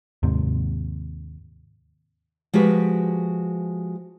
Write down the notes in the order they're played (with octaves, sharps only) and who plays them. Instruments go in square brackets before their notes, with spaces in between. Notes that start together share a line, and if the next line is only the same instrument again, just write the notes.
[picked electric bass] D#2 G#2 C3
[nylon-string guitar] F3 G#3 F#4 G4 B4